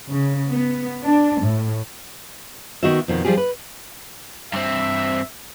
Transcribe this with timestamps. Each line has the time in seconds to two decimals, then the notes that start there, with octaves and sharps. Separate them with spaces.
0.10 C#3
0.48 B3
1.02 D4
1.41 A2
2.83 D#3 B3 F#4 D#5 E5
3.08 F2 B2 D#3
3.25 F3 G3 F4 G4 G#4
3.37 B4
4.53 G2 C4 E5